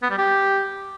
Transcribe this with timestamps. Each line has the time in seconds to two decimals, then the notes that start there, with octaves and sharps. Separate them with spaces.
0.02 B3
0.10 G3
0.18 G4